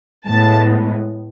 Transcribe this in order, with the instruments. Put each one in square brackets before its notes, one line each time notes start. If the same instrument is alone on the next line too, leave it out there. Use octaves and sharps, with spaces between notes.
[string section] A2 G#3 B3 A5